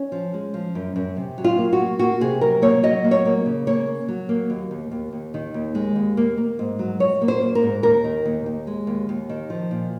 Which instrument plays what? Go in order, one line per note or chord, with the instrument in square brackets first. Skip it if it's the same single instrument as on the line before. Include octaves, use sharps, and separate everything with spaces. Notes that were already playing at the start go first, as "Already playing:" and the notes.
Already playing: [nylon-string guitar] C#4
F3
G#3
F3
F#2
F#2
C3
F#3
F4
A#3
F#4
A#3
A#3 F#4
C3 G#4
F#3 A#4
A#3 C#5
F#3 D#5
A#3
C#5
A#3
C#3
A#3 C#5
A#3
F#3
A#3
D#2
D#2
D#2
D#2
D#3
D#2
G#3
D#2
A#3
A#3
G#2
F#3
F#3 C#5
A#3
C5
A#3
A#4
G#2
D#2 A#4
D#3
D#2
D#2
G#3
D#2
D#2
D#3
F3
A#2